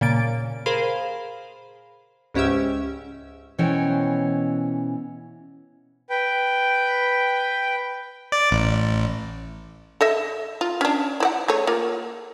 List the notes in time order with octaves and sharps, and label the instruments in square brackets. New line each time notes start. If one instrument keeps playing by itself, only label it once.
[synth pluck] A#2 C#3 A#3 A6 D7
G#4 A#4 C5 F5 B5
C#2 G#2 C#4 G4 E5 E6
[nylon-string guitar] B2 E3 C#4 C5 C#5 G5
[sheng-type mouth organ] B4 G5
[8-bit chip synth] D5
A1
[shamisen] A4 D#5 E5
F4
C#4 D4
E4 D5 F#5
A3 G#4 C#5
A#3 F4